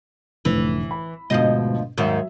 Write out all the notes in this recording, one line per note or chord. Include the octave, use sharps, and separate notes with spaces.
F1 A2 D3 E3
B5
D2 G#2 B2 F3 D#5
D#2 G#2 D#3 F#3 E5